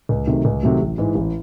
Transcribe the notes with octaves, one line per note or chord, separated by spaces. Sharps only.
C#2
C3 D#3 F#3 A3
C#2
C3 D#3 F#3 A3
A1
G#2 E3 G#3
A1